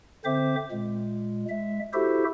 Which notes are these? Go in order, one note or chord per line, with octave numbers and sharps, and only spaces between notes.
D3 C4 C5 E5 D6
A#2 G#3
G#3 E5
E4 F#4 G4 A4 C5 E5